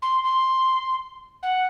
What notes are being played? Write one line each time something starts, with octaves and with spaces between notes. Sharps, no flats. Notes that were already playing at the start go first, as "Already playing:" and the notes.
C6
C6
F#5